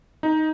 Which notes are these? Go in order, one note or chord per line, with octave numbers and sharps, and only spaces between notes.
D#4